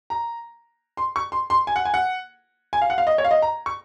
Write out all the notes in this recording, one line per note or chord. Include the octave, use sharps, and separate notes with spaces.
A#5
C6
C#6
C6
C6
G#5
F#5
G#5
F#5
G#5
F5
F#5
F5
D#5
C#5
F5
D#5
A#5
C#6